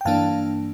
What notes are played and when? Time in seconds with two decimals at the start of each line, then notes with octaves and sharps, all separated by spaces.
0.01 G5
0.05 G2 E3 A#3 D4 F5 A5